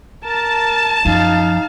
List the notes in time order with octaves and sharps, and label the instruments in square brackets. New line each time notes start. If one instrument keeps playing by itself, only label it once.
[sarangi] A#4 [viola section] A5
[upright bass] F#2 F3 [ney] D#4 [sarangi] F5